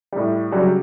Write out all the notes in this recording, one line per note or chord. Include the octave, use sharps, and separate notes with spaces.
A2 G3
C#3 F#3 G3 F#4